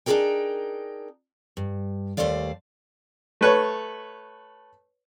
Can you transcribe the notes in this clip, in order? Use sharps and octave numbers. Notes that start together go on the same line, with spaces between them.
D4 D#4 F#4 G#4 A#4 G5
G2
D#2 C#3 A3 C5 D5 F5
A3 B4 C#5